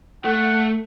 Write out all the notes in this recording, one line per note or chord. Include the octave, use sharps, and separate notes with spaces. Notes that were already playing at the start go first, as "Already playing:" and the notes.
A3 F#5